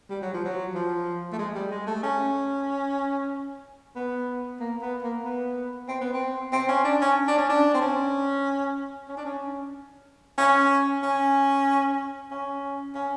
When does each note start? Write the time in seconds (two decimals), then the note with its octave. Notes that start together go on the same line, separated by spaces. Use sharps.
0.10 G3
0.22 F#3
0.34 F3
0.45 F#3
0.75 F3
1.33 A3
1.39 G#3
1.55 G3
1.71 G#3
1.87 A3
2.03 C#4
3.96 B3
4.60 A#3
4.82 B3
5.03 A#3
5.24 B3
5.88 C4
6.01 B3
6.14 C4
6.52 C4
6.69 C#4
6.85 D4
7.02 C#4
7.28 D4
7.38 C#4
7.49 D4
7.74 C4
7.81 C#4
9.09 C#4
9.18 D4
9.25 C#4
10.38 C#4
11.03 C#4
12.31 C#4
12.95 C#4